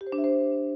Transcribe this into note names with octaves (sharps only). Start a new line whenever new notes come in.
G4
C5
D4
E5
C5